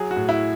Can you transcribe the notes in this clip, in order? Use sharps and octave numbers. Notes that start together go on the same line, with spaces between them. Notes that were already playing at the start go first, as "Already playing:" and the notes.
Already playing: F#3 G#4
F#4
A2
E4